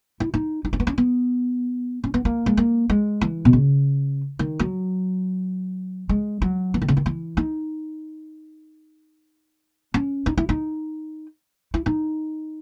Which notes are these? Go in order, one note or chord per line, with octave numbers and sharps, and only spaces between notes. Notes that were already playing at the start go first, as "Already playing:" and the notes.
E4
D#4
D#4
C#4
B3
C#4
B3
C#4
B3
A#3
G#3
A#3
G#3
E3
B2
C#3
D#3
F#3
G#3
F#3
E3
D#3
C#3
D#3
E3
D#4
C#4
D#4
E4
D#4
E4
D#4